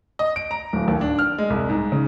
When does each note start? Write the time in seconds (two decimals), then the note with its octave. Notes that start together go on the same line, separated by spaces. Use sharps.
0.19 D#5
0.36 D7
0.51 A#5
0.73 D1
0.88 D#2
1.01 D4
1.19 F6
1.38 G#3
1.50 C2
1.70 G#2
1.92 C#3